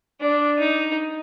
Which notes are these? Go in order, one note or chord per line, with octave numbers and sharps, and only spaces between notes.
D4
D#4